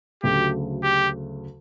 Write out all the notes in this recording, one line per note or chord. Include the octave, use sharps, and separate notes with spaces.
D2 C#3 F#3 A3 G4
G4